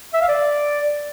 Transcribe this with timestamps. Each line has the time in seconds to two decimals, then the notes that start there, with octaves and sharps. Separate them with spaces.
0.14 E5
0.21 F5
0.28 D5